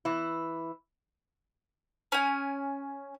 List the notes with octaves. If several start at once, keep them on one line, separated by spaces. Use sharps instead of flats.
E3 E4
C#4 G#5